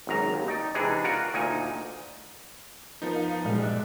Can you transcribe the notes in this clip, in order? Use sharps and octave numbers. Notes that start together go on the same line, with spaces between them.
G#1 F#2 A#5
D#2
D#4 D5
C3 E3 G#3 D4 D#4 G#4
F4 F#4 A#4 D5 F#5
D2 A#2 D#4 G#5
F3 B3 D#4 A#4
F5
B1 G2 A#2 G#3
D5 E5 D6 F#6